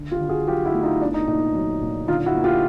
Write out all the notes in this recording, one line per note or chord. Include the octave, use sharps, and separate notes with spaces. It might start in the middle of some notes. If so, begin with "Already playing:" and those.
Already playing: D3
F4 G4
D3
F#4 G#4
F#3 F4 G4
E4 F#4
A3
D#4 F4
B3 D4 E4
D#4
A#2 D#4
F#3
A#2
D3 D#4 F4
E4 F#4
A#3
F4 G4